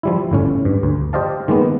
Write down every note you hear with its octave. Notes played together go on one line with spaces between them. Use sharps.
F3 G3 E4
G1 A2 C#4
G2
D2
G4 C5 D5 D#5 F5 A5
D#3 G#3 A#3 B3